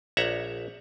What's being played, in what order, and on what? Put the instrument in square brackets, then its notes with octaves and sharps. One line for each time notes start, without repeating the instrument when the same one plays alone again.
[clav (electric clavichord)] A#1 C#5 E5 F#5 A#5